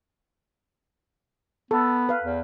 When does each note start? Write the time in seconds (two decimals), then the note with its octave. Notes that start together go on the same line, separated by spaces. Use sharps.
1.71 B3 A4
2.09 B4 F5
2.23 E2